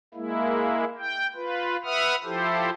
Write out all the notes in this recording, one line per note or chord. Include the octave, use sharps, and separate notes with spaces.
G#3 A#3 E4
G5
F4 B4
B4 E5 F#5 D#6 F6
F3 E4 G4 A4 C5